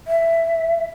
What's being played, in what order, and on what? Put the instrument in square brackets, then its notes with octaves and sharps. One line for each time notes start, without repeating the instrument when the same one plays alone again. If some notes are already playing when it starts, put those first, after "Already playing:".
[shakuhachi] E5